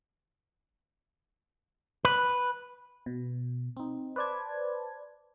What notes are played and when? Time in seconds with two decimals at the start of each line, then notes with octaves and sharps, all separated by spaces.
2.05 B4
3.06 B2
3.77 C4 D#4
4.16 B4 C5 D5 A5 G#6